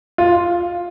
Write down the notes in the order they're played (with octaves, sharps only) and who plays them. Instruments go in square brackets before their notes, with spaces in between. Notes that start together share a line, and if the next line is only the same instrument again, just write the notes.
[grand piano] F4